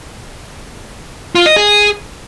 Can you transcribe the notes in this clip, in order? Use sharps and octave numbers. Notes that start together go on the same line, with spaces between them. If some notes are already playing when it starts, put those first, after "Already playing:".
F4
D#5
G#4